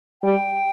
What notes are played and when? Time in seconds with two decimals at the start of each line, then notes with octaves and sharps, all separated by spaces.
0.23 G3 G5